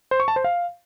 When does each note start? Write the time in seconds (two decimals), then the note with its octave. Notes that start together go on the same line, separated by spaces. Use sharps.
0.11 C5
0.20 C#6
0.28 A5
0.36 C5
0.44 F5